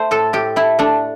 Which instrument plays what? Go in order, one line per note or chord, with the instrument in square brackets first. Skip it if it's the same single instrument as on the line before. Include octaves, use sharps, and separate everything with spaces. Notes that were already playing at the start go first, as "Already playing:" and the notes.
Already playing: [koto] A3 C5
A2 A4
A2 G4
A3 E4
A3 D4